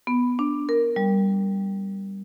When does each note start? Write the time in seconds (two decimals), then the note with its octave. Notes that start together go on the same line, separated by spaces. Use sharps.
0.07 B3
0.39 D4
0.69 A#4
0.96 G3